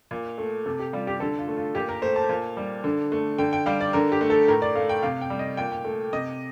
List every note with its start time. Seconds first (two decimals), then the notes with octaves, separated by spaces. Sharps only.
0.11 A#2
0.38 A3
0.66 C3 A4
0.79 G4
0.93 G3 F4
1.07 G4
1.20 D3 A4
1.39 F4
1.48 A3
1.57 F4
1.75 A#2 G4
1.89 A#4
2.02 A3 C5
2.16 A5
2.29 A#2
2.57 G3
2.84 D3
3.12 A3
3.38 D3 G5
3.53 G5
3.66 G3 F5
3.81 D5
3.93 D3 A#4
4.12 G4
4.21 A3
4.30 A4
4.48 A2 A#4
4.62 D5
4.75 A3 F5
4.89 G5
5.03 C3 F5
5.21 G5
5.30 G3
5.39 D#5
5.57 A#2 G5
5.72 G5
5.85 A3
6.13 C3 D#5